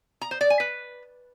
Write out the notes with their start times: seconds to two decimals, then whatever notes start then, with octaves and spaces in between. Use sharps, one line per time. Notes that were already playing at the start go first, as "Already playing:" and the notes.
0.21 A#5
0.31 C5
0.41 D5
0.50 G#5
0.60 B4